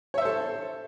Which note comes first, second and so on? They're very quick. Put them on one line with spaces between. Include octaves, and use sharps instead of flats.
C#5 E5 C5 A4